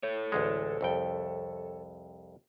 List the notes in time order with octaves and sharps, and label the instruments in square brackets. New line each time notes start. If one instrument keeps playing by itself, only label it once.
[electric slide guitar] A4 C#5
[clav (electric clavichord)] A1 D2 G#3
C2 F2 G5